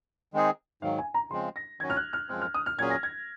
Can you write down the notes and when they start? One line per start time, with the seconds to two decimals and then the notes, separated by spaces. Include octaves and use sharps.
0.33 D#3 G#3 C4 D#4 G#4
0.82 G#2 D#3 F#3 F5
0.98 G#5
1.14 A#5
1.31 C#3 F3 G#3 C4 C6
1.56 A#6
1.80 D#3 F#3 C#4 F#4 G#6
1.90 F6
1.97 F#6
2.13 F6
2.29 F#2 F3 G#3 C4 F6
2.41 F6
2.54 D#6
2.66 F6
2.78 A#2 F#3 C#4 G#4 G#6
2.90 A#6
3.03 G#6